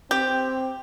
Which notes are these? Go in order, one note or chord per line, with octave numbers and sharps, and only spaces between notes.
C4 G4 G6